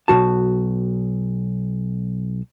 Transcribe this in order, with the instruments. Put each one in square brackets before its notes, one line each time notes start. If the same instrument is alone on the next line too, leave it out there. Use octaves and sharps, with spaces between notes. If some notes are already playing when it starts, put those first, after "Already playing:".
[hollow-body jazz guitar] B1 B2 F#4 A5